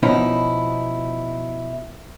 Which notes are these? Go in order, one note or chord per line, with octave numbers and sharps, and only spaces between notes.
B2 F3 C#4 D#4 E4